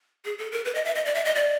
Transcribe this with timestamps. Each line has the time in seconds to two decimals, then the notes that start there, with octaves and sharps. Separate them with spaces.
0.25 G#4
0.39 A4
0.52 A#4
0.65 B4
0.75 D#5
0.85 E5
0.95 D#5
1.06 D5
1.15 E5
1.25 D#5
1.35 D5